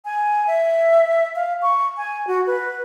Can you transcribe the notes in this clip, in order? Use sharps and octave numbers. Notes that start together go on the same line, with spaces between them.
G#5
E5
F5
C#6
G#5
F#4
B4